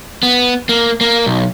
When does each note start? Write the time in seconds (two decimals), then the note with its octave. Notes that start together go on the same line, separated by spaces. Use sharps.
0.23 B3
0.69 A#3
1.01 A#3
1.26 B1